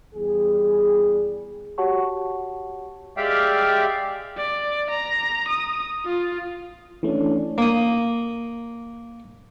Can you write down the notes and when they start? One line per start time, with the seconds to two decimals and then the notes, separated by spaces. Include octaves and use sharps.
0.14 E2 G3 G#4
1.78 F#4 G4 C#5 F#5 A5 C#6
3.17 G#3 G4 D5 E5 F5 G5
4.37 D5
4.90 A#5
5.48 D#6
6.05 F4
7.03 E3 A3 C#4 D4
7.58 A#3 D#6